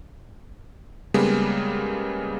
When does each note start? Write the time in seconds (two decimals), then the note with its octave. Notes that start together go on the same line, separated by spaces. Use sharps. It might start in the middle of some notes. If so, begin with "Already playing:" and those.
1.14 C#3 G3 G#3 A#3 B3